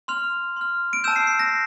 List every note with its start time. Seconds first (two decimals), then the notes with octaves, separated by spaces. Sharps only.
0.08 C6 F6 F7
0.56 C6 F6
0.93 D7
1.04 A5 E6 G6 E7
1.16 C7
1.27 C7
1.39 A#6